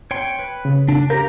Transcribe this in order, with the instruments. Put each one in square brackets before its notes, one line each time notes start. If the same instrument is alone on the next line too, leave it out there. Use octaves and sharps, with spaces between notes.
[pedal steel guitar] C#5 G5 C6
B4
[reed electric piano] C#3
[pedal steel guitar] D4
[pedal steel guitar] G4 F5 G6 [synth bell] A#4